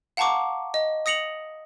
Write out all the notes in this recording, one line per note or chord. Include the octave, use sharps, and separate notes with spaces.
F5 F#5 A5 A#5 C#6 D6
D#5
D#6 A#6 C#7 F7 F#7